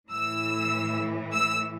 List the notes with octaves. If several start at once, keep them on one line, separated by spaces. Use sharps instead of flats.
A2 E3 E6
E6